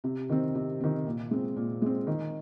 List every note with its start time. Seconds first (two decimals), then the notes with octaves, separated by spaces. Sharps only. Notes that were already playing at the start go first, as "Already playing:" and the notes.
0.04 C3
0.29 D#3 C4
0.55 C3
0.80 D#3 C4
1.06 A#2
1.31 G#3 C4
1.56 A#2
1.82 G#3 C4
2.07 D#3